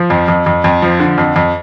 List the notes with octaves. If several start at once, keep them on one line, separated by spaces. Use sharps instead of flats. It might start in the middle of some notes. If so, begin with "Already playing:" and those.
Already playing: F3
F2
F2
F2
F2
F3
D3
F2
F2